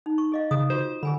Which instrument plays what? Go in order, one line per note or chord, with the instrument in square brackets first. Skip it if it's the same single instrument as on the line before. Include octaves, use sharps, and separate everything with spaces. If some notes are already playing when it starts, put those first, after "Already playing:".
[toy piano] D#4
C#6
G#4 D#5 F5
[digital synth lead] C#3 [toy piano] D#6
[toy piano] F4 F#4 G#4 [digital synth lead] C5
[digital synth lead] D3 [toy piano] G#4 G#5 B5